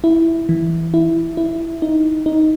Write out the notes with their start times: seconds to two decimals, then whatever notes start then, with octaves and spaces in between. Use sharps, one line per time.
0.04 E4
0.49 E3
0.94 E4
1.37 E4
1.82 D#4
2.26 D#4